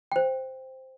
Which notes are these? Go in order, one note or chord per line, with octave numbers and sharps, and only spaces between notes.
C5 G5